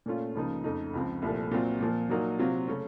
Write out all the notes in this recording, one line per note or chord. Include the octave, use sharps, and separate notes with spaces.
A#2 A3 C#4 F4
C#2 C#3 F3 A#3 D#4
F2 C#3 A3 D#4
C#2 C#3 F3 C4
C2 A#2 F3 A3
A#2 F#3 C4 F4
A#2 F3 A#3
A#2 F#3 A#3 D#4
C3 F#3 C4 F4
C#3 A3 C#4